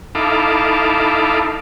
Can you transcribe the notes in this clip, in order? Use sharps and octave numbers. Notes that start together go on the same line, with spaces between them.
D#4 E4 A4 F5 D6